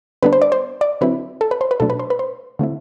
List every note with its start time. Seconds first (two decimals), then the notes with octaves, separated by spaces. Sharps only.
0.23 D3 G3 B3 D4 B4
0.33 C5
0.42 D5
0.52 C5
0.81 D5
1.01 D3 F#3 C4 E4 B4
1.41 A4
1.51 B4
1.61 C5
1.71 B4
1.80 B2 F#3 A3 D4 A4
1.90 B4
1.99 C5
2.10 B4
2.19 C5
2.59 D3 A3 C4 E4